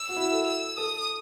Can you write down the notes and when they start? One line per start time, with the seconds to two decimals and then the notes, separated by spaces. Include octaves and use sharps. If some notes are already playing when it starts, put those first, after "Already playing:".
Already playing: E6
0.09 F#4
0.17 E4
0.32 A4
0.47 E6
0.77 A4 D#6